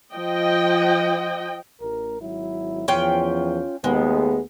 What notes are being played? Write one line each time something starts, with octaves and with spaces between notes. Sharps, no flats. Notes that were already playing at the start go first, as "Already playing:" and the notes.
F3 D#5 G5
A1 A#4
G#1 F#3 E4
E2 F3 C#4 F4 G5
D#2 G#3 A3 B3